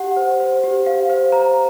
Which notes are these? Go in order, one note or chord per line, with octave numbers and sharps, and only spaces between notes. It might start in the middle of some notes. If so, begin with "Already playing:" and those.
Already playing: G4 F#5
C5
C5
G4
G4 F5
C5
C5 A#5